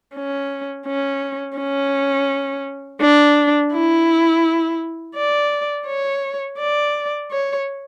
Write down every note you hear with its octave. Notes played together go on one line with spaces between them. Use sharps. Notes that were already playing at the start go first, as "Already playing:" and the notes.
C#4
C#4
C#4
D4
E4
D5
C#5
D5
C#5